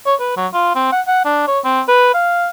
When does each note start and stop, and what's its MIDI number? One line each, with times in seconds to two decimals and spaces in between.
0.06 0.15 73
0.20 0.33 71
0.37 0.47 54
0.53 0.74 65
0.75 0.91 60
0.92 1.01 78
1.07 1.23 78
1.25 1.44 62
1.47 1.59 73
1.65 1.81 60
1.88 2.10 71
2.14 2.48 77